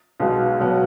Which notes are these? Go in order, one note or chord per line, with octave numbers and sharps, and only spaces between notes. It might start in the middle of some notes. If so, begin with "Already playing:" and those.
B1 B2 G#3
B2 F#3 B3